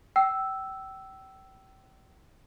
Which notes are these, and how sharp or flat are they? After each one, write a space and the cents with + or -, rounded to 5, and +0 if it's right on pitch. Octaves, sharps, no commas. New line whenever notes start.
G5 -30 E6 +0